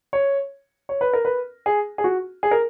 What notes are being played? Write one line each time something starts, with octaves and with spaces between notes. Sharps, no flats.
C#5
C#5
B4
A#4
B4
G#4
G#4
F#4
G#4
A#4